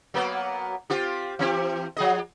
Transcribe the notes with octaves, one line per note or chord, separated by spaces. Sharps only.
F#3 A#3 B3
C4 F4 G4
E3 C4 G4
F3 G#4 D#5